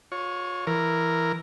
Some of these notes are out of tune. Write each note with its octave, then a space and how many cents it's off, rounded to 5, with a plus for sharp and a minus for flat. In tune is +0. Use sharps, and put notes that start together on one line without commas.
F4 +40 C#5 +0
E3 +10 A#4 +0